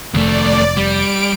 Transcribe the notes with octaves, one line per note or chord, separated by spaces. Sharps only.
F1 D#2 A3 D5
G3 D7